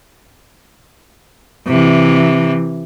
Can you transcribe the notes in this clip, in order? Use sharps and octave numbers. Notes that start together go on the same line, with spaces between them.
C3 E3